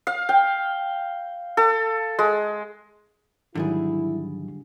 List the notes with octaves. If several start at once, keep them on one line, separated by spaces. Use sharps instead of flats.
F5
G5
A4
G#3
G#2 D3 D#3 F#3 G3 E4 G#4